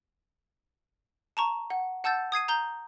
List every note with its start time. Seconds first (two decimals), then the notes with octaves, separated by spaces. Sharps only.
1.37 A5 A#5 C#6
1.70 F#5
2.04 F#5 A5 E6 G6 A6
2.32 D#6 G#6 C7 D#7
2.48 A#5 G6 G7